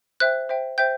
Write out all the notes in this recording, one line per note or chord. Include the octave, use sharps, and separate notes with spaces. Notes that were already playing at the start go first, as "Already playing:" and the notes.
C5 E5 G5 F#6
C5 E5 G5
C5 E5 G5 G6